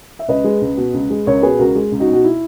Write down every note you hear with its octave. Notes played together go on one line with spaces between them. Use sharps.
E5
C#2 B4 D#5
G#3
C#2
B2
C#2
G#3
C#2 A#4 C#5
B2 G#4 B4
C#2 F#4 A#4
G#3
C#2
D#4 F#4
B2
F#4
E4